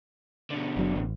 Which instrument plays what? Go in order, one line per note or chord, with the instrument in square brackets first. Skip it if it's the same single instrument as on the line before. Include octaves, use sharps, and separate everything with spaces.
[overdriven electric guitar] B2 D3
[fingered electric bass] F#1 F#3 D4
A1